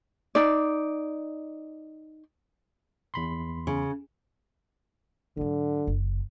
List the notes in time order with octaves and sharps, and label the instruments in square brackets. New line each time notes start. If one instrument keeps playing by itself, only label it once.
[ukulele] D#4 D5
[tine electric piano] E2 B5 C6
[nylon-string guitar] C#3
[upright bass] G#2 F#3 [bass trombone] D3
[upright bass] F#1